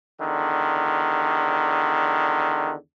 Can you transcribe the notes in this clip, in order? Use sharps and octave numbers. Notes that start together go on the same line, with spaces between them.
E2 D3 D#3